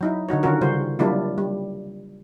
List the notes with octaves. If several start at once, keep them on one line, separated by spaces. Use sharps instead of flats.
F#3 D#4 E4
D3 D#4 F#4 C#5
D3 D#3 C#4 F4 F#4 A#4
C#3 G3 F4 F#4 C5
F#3 G3 A#3 D4 E4 F4
G3